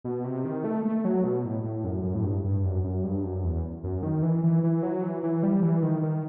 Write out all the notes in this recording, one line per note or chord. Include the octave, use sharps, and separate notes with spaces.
B2
C3
D#3
A3
A3
F#3
B2
A2
A2
F#2
F#2
A2
G2
G2
F#2
F#2
G2
F#2
E2
F#2
D#3
E3
E3
E3
F#3
E3
E3
G3
E3
D#3
D#3